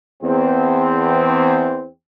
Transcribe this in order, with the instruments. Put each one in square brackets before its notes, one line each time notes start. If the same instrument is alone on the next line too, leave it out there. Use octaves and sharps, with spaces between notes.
[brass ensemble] E2 C4